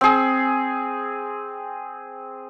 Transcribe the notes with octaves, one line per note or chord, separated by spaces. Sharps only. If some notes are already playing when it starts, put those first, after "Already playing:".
C4 G#4